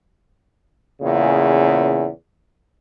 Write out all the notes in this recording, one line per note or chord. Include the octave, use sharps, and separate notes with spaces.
E2 A#2 C#3